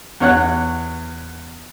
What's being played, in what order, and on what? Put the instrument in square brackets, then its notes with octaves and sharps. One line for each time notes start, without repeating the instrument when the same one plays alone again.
[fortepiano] E2 C#5 F#5 F#6